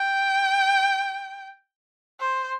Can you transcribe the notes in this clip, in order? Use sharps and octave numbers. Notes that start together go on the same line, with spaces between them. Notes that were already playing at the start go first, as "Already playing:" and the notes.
Already playing: G5
C5